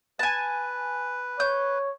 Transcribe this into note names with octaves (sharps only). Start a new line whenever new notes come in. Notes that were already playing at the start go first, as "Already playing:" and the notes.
B4 G#5 A5
C#5 G6